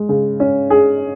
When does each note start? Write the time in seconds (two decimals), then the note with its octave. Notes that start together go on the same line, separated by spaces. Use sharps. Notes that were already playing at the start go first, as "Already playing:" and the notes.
Already playing: G#3
0.09 C#3
0.40 C#4
0.70 G#4